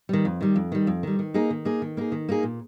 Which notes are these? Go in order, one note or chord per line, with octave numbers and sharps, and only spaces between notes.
D#3 G3
F2
D#3 G3
F2
D#3 G3
F2
D#3 G3
D#3
A#3 D#4 G#4
D#3
A#3 D#4 G#4
D#3
A#3 D#4 G#4
D#3
A#3 D#4 G#4
A#2